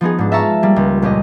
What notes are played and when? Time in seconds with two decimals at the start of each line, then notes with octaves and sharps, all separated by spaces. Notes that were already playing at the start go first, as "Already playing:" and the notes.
0.01 F3 B3 D#4 G#4
0.18 G#2 D4
0.32 E5 F5 A5 A#5 C#6 E6
0.63 G3 A#3
0.76 C#2
1.02 A#1 C#4 G4 D#5